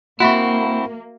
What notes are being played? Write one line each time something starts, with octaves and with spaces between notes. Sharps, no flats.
A#3 C4 E4 F#4 E5 F#5 B5 C#6